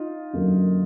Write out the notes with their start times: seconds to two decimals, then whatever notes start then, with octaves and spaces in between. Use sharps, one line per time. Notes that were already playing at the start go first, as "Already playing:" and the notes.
Already playing: D#4 F4
0.33 F#2 D3 F#3 A#3